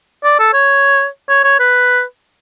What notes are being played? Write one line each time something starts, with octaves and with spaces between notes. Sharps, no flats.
D5
A4
C#5
C#5
C#5
B4